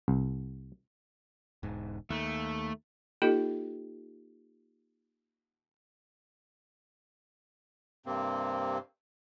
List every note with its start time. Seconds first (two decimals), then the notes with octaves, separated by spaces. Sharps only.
0.08 C2
1.63 E1 G#2
2.10 D#2 A3
3.22 A#3 D#4 F4 G4 A4 D#5
8.06 G2 C3 A#3 C4